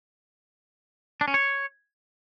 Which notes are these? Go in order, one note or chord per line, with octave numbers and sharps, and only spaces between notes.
D4
C#4
C#5